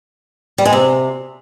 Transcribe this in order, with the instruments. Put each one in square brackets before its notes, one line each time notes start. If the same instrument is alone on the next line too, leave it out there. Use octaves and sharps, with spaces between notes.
[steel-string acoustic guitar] G3
G#3
C3